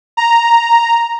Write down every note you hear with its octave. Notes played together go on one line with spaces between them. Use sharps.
A#5